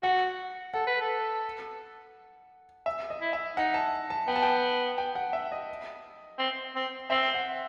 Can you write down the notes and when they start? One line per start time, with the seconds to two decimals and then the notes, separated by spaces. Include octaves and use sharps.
0.03 F#4 F#5
0.74 A4 F#5
0.87 B4
1.01 A4
2.86 E5
3.10 D#5
3.21 E4
3.33 E5
3.57 D#4 F#5
3.74 A5
4.10 A5
4.28 B3 G5
4.36 A5
4.42 G5
4.98 G5
5.15 F#5
5.33 E5
5.52 D#5
6.39 C4
6.76 C4
7.10 C4 E5
7.34 F#5